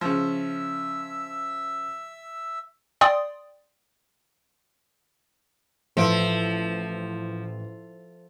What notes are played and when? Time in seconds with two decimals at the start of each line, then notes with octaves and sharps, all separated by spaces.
0.01 C#3 F3 E5 E6
3.01 D5 G5 C6 D#6
5.97 A1 F3 A4 B4 E5 D7